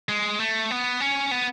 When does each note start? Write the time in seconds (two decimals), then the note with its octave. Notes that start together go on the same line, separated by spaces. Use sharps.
0.09 G#3
0.40 A3
0.71 B3
1.00 C#4
1.31 B3